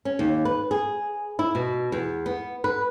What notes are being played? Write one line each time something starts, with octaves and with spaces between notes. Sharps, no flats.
C#4
D#2
B4
G#4
E4
B2
E2
B3
B4